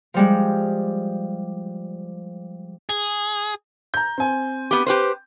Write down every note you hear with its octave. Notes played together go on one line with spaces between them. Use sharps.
F3 G3 G#3
G#4
A#5 G6
C4 G#5
B3 G4
G4 B4 C5